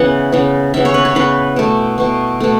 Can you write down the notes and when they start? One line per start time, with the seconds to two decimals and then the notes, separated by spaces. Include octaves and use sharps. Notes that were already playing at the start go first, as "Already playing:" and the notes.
Already playing: C#3 E3 B3 F#5
0.32 C#3 E3 B3
0.74 C#3 E3 B3 E5
0.85 C#5
0.94 B4
1.05 C#5
1.15 C#3 E3 B3 B4
1.56 B2 A3
1.98 B2 A3
2.40 B2 A3